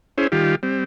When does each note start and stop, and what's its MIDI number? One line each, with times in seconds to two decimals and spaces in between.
0.18 0.27 61
0.18 0.27 64
0.18 0.27 68
0.18 0.27 72
0.32 0.55 51
0.32 0.55 55
0.32 0.55 65
0.32 0.55 67
0.63 0.84 55
0.63 0.84 60